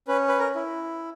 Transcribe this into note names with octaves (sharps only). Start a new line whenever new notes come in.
C#4 B4
B4
A#4
E4